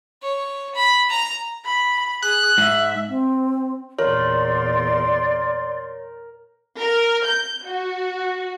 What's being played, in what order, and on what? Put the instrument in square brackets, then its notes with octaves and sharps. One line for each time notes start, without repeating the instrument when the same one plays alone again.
[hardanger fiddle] C#5
B5
A#5
[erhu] B5
[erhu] G#4 [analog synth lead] F#6
[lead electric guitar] G#2 [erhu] E5
[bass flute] C4
[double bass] E2 A#2 [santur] A#4 [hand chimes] C#5 [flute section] D5 C6
[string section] A#4
G6
F#4